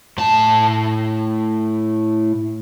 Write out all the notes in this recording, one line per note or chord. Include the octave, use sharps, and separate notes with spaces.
A2 A5